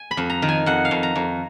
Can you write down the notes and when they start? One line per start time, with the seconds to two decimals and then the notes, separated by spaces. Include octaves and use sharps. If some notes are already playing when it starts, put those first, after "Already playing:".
Already playing: G#5
0.11 B5
0.17 F2
0.30 A#5
0.42 D#3
0.49 G#5
0.66 F2 F#5
0.85 F5
0.91 F2
1.03 A#5
1.15 F2